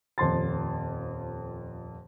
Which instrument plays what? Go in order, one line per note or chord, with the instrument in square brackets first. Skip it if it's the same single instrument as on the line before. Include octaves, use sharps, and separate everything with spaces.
[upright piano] D#1 F2 C6 A6